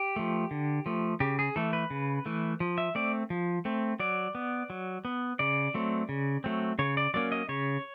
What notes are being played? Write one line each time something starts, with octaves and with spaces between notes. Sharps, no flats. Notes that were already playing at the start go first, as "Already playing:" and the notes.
Already playing: G4
F3 A3
D3
F3 A3
C#3 G4
G#4
E3 A3 A4
B4
C#3
E3 A3
F3
E5
A3 C4 D5
F3
A3 C4
F#3 D5
B3
F#3
B3
C#3 D5
F#3 A3 C4
C#3
F#3 A3 C4
C#3 C#5
D5
F#3 A#3 C#4 D5
D#5
C#3 C#5